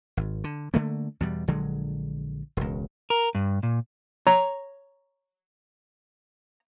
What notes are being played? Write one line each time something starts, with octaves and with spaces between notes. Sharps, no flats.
G#1
D3
D3 A3 A#3
E2 B2 G3
A#1 D3 F#3 G#3
E1 C#2
A#4
G2
A#2
C#5 A#5